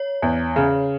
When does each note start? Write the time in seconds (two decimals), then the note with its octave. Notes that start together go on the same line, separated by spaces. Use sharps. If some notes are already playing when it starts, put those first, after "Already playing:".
Already playing: C#5
0.22 E2
0.56 C#3